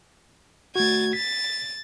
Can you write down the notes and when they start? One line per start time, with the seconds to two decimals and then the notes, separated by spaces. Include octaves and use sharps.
0.76 A3 F#4 G#6 A6
1.13 A6 B6